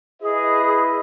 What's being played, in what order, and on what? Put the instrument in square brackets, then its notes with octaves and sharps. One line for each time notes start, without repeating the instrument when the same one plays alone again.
[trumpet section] E4 B4 D#5 [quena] G#4